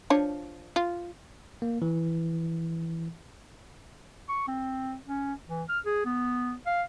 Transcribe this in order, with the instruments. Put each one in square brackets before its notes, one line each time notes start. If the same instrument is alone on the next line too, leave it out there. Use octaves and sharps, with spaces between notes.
[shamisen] F3 D4 C#5
F4
[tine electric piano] A#3
E3
[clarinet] C#6
C4
C#4
E3
F6
G#4
B3
F5